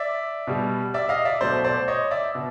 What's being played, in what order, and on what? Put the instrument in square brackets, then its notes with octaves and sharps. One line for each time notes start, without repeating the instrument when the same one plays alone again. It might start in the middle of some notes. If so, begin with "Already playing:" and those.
Already playing: [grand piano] D5 E5
B2 G3
D5 E5
D#5 F5
D5 E5
B2 F#3 A3 C5 D5
C5 D5
C#5 D#5
D5 E5
B2